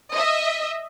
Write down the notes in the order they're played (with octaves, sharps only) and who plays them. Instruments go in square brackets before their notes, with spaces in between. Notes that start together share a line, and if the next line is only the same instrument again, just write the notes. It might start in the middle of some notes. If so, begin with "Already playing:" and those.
[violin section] D#5 E5